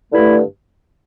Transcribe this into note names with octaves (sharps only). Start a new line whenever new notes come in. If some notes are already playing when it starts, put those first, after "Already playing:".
G2 D3 A3 E4